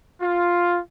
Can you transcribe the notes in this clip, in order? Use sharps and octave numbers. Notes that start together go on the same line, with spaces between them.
F4